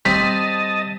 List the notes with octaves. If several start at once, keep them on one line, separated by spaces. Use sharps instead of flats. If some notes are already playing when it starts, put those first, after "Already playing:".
G3 C4 C5 D5 D#5 A5 B6